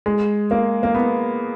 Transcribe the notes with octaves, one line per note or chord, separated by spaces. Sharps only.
G#3
A#3
A#3
B3